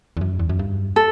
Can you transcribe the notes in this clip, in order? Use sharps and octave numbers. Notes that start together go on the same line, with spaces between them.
E2
F#2
E2
F#2
G2
A4